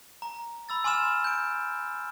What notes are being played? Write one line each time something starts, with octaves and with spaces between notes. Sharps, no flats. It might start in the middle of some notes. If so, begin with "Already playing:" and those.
A#5
B5 E6 A6
G#5 C6 D6 F6 E7
G6 D7